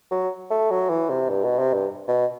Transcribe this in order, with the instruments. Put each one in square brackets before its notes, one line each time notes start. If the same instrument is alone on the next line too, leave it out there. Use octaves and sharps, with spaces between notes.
[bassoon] F#3
A3
F#3
E3
C3
G2
B2
C3
G2
B2